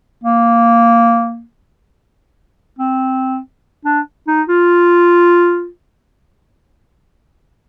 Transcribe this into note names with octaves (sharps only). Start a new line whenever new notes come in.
A#3
C4
D4
D#4
F4